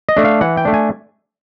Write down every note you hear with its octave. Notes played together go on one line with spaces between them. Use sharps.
D#5
A3 D4
F5
E3 F#5
G5
A3 D4
G#5